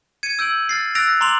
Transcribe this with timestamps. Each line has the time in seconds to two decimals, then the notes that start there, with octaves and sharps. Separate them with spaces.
0.23 G#6 C#7 D#7
0.39 E6 G6 D7 F#7
0.69 F6 A6 C7
0.95 E6 F#6 A6 A#6 D7 F7
1.21 A#5 C6 D6 F7 F#7